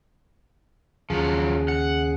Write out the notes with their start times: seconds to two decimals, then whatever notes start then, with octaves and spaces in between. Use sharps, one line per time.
1.10 D#2 C#3 F3 F#3 G#4
1.68 F#5